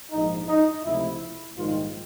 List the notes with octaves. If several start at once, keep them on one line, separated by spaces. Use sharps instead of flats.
A#1 G#2 F3 D#4
D#4
C#2 C3 F3 A3 E4
A#1 G#2 D#3 G3 F4